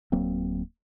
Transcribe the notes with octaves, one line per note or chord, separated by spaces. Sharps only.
D1 F#3 A#3 C4